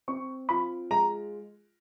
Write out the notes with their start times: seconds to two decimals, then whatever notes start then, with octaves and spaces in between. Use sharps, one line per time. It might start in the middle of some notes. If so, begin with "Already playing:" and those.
0.08 C4 C#6
0.49 F4 B5
0.91 G#3 A#5